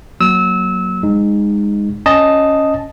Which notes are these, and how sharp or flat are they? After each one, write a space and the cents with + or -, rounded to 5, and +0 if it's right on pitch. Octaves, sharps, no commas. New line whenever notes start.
F#3 +0 A#3 +0 E6 -25
G#3 -20 D#4 -15
C#4 +0 D#5 +0 A5 +0